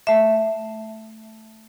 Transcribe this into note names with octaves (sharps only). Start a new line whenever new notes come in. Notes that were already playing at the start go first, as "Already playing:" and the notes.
A3 E5